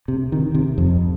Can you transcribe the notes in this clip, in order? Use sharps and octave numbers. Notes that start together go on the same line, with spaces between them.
C3
D#3
C3
F2